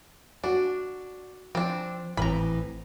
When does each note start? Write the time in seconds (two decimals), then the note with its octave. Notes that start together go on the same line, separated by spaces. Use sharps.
0.44 D4 F#4
1.55 F3 C4 D4
2.17 G#1 A2 E3 C4 A#5 B5